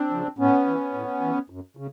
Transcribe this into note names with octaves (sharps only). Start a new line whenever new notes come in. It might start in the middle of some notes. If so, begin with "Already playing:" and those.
Already playing: C4 D4
C#3 F3
A2 B3 C#4
E3
A2
E3
F#2
C#3